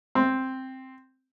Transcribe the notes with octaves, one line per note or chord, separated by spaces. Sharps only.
C4